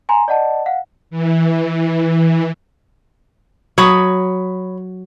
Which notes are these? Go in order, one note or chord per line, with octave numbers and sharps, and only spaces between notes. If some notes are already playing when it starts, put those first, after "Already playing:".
G#5 A#5 C6
D5 D#5 F#5 A5
F5 F#5
E3
F#3 C#5 B5 D#6